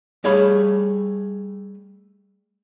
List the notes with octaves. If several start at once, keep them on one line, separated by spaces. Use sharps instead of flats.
G3 A3 G#4 C#5 F5 B5